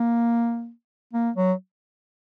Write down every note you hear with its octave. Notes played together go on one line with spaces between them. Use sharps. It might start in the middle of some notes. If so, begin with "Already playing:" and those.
Already playing: A#3
A#3
F#3